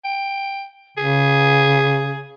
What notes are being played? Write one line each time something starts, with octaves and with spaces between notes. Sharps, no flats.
G5
C#3 G#4